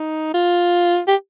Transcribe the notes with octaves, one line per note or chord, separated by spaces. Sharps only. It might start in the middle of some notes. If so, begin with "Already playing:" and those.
Already playing: D#4
F4
G4